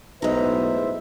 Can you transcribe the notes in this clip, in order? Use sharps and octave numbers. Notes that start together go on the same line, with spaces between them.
B1 A2 G#3 B4 C5 E5 A#5